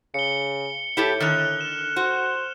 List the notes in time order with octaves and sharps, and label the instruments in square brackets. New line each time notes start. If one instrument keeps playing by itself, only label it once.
[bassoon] C#3 [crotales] C#7 G7
[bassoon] A2 [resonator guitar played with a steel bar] E4 G4 A4
[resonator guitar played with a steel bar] D3 D#3 [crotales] F6 F#6 F7
[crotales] E7
[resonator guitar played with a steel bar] F#4 [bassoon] C5